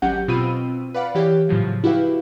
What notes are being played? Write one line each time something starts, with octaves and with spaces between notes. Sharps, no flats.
G#1 F#3 C#4 G4 F#5 G6
B2 C4 F4 B5 E6 D#7
B4 D5 F5 F#5 B5
E3 G4 C#5 F5
A2 C#3 F3 F#3
E4 F#4 G4 B4 F5